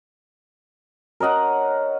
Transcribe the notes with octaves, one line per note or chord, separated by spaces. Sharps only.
A#4 C#5 D#5 F#5